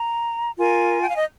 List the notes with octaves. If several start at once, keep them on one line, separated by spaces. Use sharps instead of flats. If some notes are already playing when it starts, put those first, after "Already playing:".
Already playing: A#5
F4 A#4 G#5
G5
F5
D#5